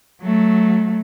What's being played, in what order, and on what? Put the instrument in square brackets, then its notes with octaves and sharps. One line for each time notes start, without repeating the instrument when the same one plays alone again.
[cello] F#3 A3